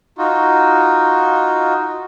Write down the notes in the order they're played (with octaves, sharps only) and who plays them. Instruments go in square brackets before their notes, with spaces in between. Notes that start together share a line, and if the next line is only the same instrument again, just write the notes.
[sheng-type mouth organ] D#4 F4 F#4